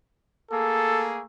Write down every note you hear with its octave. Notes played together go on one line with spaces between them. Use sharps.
A3 A#3 G#4 A4